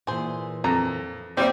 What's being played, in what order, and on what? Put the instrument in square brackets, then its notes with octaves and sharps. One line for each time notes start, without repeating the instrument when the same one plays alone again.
[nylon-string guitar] A#2 E3 [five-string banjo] G#4 C5
[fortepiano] F2 [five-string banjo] A#5
[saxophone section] G3 [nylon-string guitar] A#3 E5 [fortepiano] C4 [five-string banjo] G4 C#5 D5